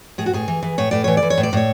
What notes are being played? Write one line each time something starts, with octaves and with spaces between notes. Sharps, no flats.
A2 G#4
F#4
A2 G#4
E3
E3
A2 C#5
A2 D5
E3 C#5
D5
E3
C#5
A2
D5
A2 C#5